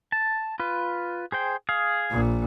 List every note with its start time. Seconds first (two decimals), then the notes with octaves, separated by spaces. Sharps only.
0.12 A5
0.60 F4 B4
1.32 G#4 C5 G5
1.69 G#4 F5
2.10 A#1 A#2